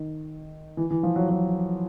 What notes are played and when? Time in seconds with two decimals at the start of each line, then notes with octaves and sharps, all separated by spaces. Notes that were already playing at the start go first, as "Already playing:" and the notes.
Already playing: D#3
0.77 E3
0.90 E3
1.03 F3
1.16 F#3
1.29 F#3